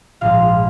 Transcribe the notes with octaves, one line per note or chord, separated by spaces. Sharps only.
A#1 G#2 F3 G#3 F5